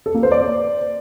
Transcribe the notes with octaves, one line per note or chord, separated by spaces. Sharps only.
A4
A#3
C5
D5